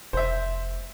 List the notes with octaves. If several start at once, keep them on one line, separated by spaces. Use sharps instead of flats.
F1 C5 E5